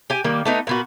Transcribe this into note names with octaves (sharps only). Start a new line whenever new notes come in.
G4 G#5
D#3 G3 A#3
A3 B3 D#4
A#2 B3 F#4